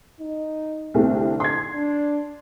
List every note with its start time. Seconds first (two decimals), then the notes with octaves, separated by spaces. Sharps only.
0.20 D#4
0.94 C2 D3 A3 C4
1.40 C6 G#6
1.74 D4